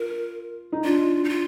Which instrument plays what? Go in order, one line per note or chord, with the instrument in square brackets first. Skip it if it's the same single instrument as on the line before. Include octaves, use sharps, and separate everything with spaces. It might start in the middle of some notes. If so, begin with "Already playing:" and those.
Already playing: [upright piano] F4 [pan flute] A#4
[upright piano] D#4
[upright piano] D4 [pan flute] F4
[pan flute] D#4
F4